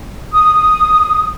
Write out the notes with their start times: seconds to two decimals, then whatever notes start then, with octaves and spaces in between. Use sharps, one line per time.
0.33 D#6